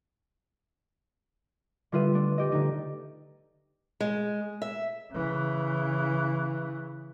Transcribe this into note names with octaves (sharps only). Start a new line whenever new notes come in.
D3 G3 F4 B4 E5 D#7
A3 D4
D4 G4 D#5
D3 A3 D#4
G#3
E5
C#3 E3